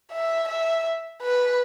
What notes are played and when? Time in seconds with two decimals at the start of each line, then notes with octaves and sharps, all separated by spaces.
0.12 E5
0.48 E5
1.22 B4